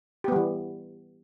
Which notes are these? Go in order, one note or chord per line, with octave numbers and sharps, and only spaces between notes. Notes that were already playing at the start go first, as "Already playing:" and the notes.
E3 G3 B3 G4